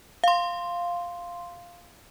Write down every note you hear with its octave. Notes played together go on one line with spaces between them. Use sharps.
F5 C6